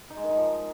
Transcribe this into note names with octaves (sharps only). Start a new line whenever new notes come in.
D#4
G#3
D#3
D#4
F3